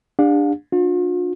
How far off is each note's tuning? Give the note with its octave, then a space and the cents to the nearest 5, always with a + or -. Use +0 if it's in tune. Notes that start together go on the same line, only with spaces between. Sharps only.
D4 +0 G4 +45 F5 +40
D4 +0 F4 +45